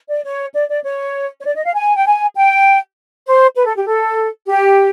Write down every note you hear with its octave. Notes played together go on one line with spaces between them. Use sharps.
D5
C#5
D5
D5
C#5
C#5
D5
D#5
F5
G#5
G5
G#5
G5
C5
B4
A4
G4
A4
G4